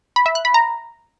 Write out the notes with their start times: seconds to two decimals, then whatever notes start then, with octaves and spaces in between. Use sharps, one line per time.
0.16 B5
0.26 E5
0.35 F#6
0.45 B5
0.54 A#5